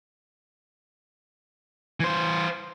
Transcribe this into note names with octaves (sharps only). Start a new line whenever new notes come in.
E3 C5